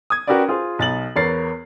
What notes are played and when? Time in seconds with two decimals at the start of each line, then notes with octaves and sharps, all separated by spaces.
0.10 D#6 G#6
0.27 C#4 F#4 G4 A#4 B4 D5
0.48 F4 G#4 C5
0.79 B1 A6 F#7
1.16 E2 B3 A#4 C#5 A6 C7